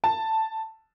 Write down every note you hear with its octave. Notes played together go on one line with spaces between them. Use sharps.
A5